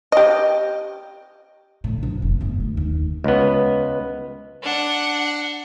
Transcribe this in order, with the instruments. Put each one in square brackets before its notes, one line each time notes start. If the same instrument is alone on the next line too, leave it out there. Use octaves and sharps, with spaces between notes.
[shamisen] G4 D#5
[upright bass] A2 D3
A#1 F#2
F1
G1 G#3
A3
D#2
[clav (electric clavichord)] C#2 B3
[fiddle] D4 F#5